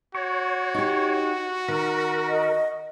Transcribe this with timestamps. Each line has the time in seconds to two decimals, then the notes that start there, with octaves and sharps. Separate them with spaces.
0.15 F#4 C#5
0.74 D#4 G4
1.68 D#3 A#4
2.29 D#5